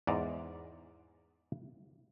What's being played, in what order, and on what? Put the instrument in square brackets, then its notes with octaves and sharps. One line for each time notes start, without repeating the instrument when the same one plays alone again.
[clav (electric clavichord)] E2 G#2 D5 A#5